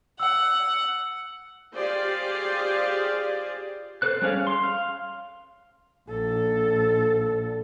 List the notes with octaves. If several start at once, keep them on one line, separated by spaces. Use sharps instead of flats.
F#5 E6
F4 G4 G#4 C5 D5 F5
A4 C5 F#6
G3 C#4 G#4 F5
C6
F5
A#1 A4